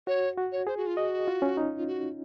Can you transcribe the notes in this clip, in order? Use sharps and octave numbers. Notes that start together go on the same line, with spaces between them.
F#4 C#5
F#4
C#5
G#4 C5
F#4
F4
F#4 D#5
F4
C#4
D#4
F4
F#4